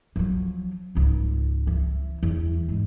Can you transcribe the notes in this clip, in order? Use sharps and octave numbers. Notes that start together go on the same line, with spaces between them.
F3 F#3
C#2 G#2
E3
E2
G#2